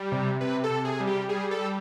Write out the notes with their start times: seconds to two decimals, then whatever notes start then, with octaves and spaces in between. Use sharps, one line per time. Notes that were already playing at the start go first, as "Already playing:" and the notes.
Already playing: G3
0.12 C3
0.41 C3 B4
0.64 A4
0.70 C3
0.85 G#4
1.00 G3
1.07 G4
1.29 G3 G#4
1.51 A4
1.59 G3